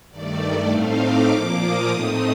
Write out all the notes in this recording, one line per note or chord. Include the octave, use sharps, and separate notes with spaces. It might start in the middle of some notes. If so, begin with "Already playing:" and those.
G2 D#3 A3 D5
A2 A3 C4 D#4 F5
D6
A#2 F3 A#3
D#6
A2 A3 C4 D#4 D#6